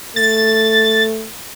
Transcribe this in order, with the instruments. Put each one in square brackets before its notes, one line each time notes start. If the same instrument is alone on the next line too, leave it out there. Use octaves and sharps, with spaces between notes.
[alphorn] A3 [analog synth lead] A6